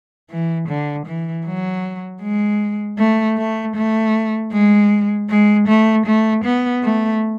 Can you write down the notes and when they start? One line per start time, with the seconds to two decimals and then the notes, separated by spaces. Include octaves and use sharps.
0.30 E3
0.69 D3
1.06 E3
1.45 F#3
2.22 G#3
2.98 A3
3.37 A3
3.76 A3
4.52 G#3
5.30 G#3
5.68 A3
6.06 A3
6.44 B3
6.83 A3